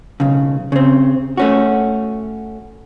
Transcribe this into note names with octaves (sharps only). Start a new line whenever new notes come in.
B1 C#3
C#3 C4
A3 C#4 F#4